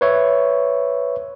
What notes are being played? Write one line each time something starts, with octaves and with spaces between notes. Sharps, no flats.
B4 C#5 E5